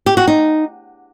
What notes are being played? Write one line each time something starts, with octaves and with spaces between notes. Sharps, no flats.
G4
F#4
D#4